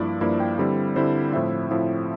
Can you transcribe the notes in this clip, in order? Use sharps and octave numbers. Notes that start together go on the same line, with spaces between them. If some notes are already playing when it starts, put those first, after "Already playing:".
Already playing: G2 F3 A#3 E4 D5
G2 F3 A#3 E4
G5
D3 G3 C4 E4
D3 G3 C4 E4 C5
A2 F3 C4 E4 E5
A2 F3 C4 E4